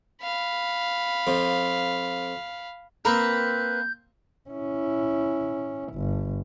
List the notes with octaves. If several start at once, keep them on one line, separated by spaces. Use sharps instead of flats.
F5 B5
F2
A#3 C4 A#4 B4 G6
C#4 E4
G1